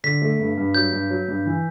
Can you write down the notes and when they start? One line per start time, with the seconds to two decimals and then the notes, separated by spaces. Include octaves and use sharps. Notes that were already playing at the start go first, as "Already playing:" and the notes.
0.04 D3 B6
0.22 A3
0.40 G2
0.58 G2
0.75 F#3 G6
0.92 G2
1.10 F#3
1.28 G2
1.46 E3